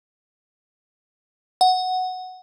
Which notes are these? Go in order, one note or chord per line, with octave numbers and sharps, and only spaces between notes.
F#5